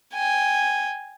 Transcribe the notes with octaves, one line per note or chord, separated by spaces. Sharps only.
G5 G#5